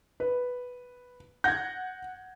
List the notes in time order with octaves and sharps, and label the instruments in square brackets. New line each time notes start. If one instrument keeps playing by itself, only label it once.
[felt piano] B4
[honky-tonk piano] F#5 A#6 [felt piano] G6 G#6